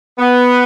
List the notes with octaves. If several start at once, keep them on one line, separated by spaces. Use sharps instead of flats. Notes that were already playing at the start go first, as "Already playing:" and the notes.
B3